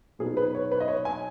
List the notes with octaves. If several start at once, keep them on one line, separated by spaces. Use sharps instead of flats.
B2 F#3 B3 D#4 G#4
B4
C#5
B4
D#5
C#5
G#5